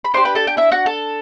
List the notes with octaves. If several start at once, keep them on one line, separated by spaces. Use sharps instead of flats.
B5
D4 G4 C5 C6
B4 B5
A4 A5
G4 G5
E4 E5
F#4 F#5
A4 A5